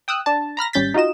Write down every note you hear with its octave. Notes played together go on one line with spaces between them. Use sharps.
G5 D#6 E6 F#6
D4 A5
A#5 B5 F6 A#6
G#1 G3 C#4 G6 A6 B6
D#4 F4 F#4 D#5 E7